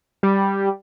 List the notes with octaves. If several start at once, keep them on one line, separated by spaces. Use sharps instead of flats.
G3